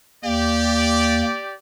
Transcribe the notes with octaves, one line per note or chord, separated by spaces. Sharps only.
D#2 A#3 G4 D5